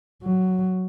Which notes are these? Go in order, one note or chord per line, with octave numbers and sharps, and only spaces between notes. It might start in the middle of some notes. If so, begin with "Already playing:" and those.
F#3